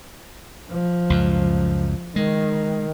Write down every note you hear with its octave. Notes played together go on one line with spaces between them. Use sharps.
F3
C#2 F#2
D#3 G#3